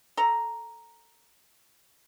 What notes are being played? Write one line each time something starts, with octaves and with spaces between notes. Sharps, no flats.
A4 A#5